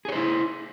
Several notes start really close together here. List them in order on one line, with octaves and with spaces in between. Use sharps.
G#4 C#5 C5 E4